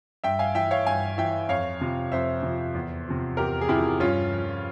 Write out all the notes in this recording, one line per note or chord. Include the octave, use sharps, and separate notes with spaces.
G2 E5 G5
F5 G#5
E3 E5 G5
C#5 F5
G2 F5 G#5
E3 E5 G5
F2 C#5 F5
C3 F3
F2 C5 E5
C3 F3
E2
C3 F3
E2 G4 A#4
G#4
C3 F3 E4 G4
G2 C#4 F4
F3